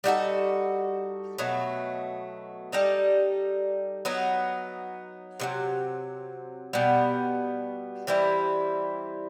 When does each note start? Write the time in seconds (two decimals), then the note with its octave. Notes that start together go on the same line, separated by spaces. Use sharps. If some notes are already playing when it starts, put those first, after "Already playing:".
0.04 G3 D#4 F#4 A4
1.38 B2 F#3 A3
2.72 G3 D#4 A4
4.05 F#3 B3 D#4
5.40 C3 D#3 F#3
6.73 B2 G3 B3
8.07 E3 G3 C4 E4